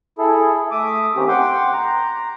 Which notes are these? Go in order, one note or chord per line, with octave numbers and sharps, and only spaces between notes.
E4 G#4 A4
A3 E5 D6 D#6
D#3 A#3 C4 C#4 G4
F#5 G5 C6 D6
A#5